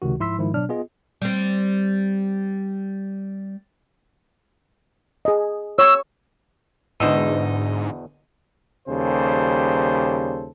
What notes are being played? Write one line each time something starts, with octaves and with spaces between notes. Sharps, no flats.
C#2 C3 D#3 F#4
G#2 F3 E4 C6 E6 B6
G#2 D#3 F3 E4
B2 F#3 D4 D5 F6
B3 F4 G#4 D#5
G3 C4
G#4 D#5
C#5 C#6 E6
E2 G#2 B2 D3 D#4 C5 E6
D#2 C#3 G3 A4 C5